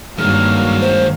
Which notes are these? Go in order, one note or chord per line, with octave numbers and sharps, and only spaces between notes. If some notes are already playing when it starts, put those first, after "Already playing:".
G2 D#3 F#3 G#3 A#3 F5 F6
C5